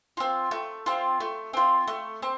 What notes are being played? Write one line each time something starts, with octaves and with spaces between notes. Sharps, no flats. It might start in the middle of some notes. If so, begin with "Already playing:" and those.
C4 F4
A3
C4 F4
A3
C4 F4
A3
C4